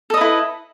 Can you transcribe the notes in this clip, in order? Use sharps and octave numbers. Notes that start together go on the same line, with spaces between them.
E4 A4 B4 D#5